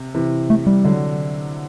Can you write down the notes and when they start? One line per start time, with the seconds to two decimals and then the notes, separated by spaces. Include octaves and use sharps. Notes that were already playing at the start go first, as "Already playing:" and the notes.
Already playing: C3
0.14 C3 E3
0.50 A3
0.66 G3
0.84 D3 F#3